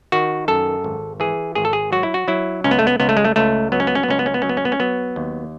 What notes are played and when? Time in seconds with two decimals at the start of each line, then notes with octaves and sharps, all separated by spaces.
0.12 D#3 F#4
0.48 F#2 A4
0.84 G#1
1.20 E3 G#4
1.55 G#1 G#4
1.65 A4
1.73 G#4
1.92 F#3 F#4
2.03 E4
2.14 F#4
2.28 F#3 E4
2.64 C#2 C#4
2.71 B3
2.79 A3
2.87 B3
3.00 C#2 B3
3.09 A3
3.17 G#3
3.25 A3
3.36 C#2 A3
3.72 F#3 B3
3.80 C#4
3.87 B3
3.95 C#4
4.03 B3
4.09 C#2 C#4
4.19 B3
4.26 C#4
4.34 B3
4.42 F#3 C#4
4.49 B3
4.57 C#4
4.65 B3
4.72 C#4
4.80 F#3 B3
5.16 D#2